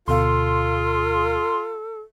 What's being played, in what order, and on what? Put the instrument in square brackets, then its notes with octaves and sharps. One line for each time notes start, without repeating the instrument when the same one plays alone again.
[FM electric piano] D2 B2 F5 [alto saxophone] F4 [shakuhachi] A4 [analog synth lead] C6